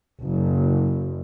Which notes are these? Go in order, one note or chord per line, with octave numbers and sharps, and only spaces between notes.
F#1